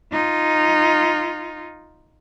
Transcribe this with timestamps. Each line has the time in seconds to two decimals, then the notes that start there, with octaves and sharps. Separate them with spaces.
0.12 D#4 F4